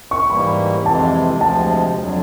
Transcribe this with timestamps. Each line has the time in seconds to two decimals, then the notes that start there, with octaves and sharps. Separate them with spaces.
0.11 C#6
0.30 G#2 E3 G3 A#3 B5
0.85 F2 C3 E3 G#3 A5
1.41 D2 C3 F3 G#3 A5
1.97 F2 D3 F#3